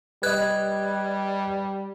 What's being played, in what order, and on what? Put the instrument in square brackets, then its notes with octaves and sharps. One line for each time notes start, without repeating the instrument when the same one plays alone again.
[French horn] G3 [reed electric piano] B4 D#5 [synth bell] F#6 G#6